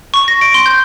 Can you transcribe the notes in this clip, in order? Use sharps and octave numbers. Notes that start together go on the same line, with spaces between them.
C#6
A#6
D7
C6
G6